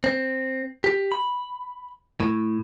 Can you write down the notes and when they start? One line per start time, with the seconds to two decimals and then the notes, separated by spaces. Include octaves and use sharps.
0.04 C4
0.84 G4
1.12 B5
2.20 A2